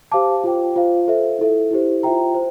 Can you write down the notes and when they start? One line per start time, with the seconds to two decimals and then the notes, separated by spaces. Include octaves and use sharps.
0.12 G4 C5 F5 A5 D6
0.44 F4 C5 G5
0.76 F4 C5 F5
1.08 A4 C5 E5
1.39 E4 A4 E5
1.71 E4 G4 C5
2.03 F4 C5 E5 G5 A#5
2.35 C5